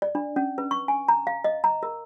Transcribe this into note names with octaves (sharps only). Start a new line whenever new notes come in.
D5
D4
C#4
B4
C#6
G#5
A#5
F5
D#5
A#5
A#4